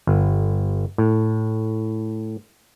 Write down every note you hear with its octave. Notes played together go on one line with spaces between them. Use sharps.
G1
A2